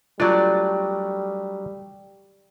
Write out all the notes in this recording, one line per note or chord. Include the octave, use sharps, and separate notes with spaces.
F#3 G3 A3 D4 F4 D5